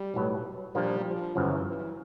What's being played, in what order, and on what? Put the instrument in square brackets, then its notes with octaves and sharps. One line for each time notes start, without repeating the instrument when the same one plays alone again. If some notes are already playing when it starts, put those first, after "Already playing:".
Already playing: [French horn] G3
[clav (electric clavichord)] B1 A2 F#3 B3
[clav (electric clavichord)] A#2 F3 A#3 D4 [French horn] G3
[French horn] F3
[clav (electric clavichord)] G1 F#2 C#3 F3 [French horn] E3
[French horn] E3